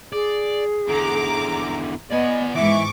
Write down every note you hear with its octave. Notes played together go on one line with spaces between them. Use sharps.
G#4 D5
E2 D3 A#5 D6
B3 D5 D#5 G#5
G#2 E3 E5 C#6 D6